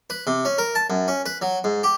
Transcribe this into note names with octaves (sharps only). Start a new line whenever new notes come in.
B4
C3
C#4
A#4
A5
F#2
C#4
B4
F#3
G#2
G4